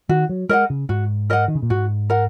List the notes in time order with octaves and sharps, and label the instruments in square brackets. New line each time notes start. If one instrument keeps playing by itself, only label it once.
[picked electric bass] D#3 [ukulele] F#4
[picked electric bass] F#3
[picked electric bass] G#3 [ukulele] A#4 D#5 F#5
[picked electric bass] C#3
[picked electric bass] G#2 [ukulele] F#4
[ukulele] A#4 D#5 F#5
[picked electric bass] D#3
C#3
A#2
[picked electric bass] G#2 [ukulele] F#4
[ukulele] A#4 F#5